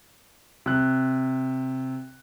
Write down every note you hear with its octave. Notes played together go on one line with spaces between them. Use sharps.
C3 F#6